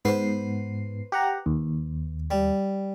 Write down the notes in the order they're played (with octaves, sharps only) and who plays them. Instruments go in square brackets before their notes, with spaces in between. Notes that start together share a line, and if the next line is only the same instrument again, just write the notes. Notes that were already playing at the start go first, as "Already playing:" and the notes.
[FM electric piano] G#2 B3 C7 [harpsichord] B4 C5
[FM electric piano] G4 F#5 A#5
D#2
[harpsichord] G3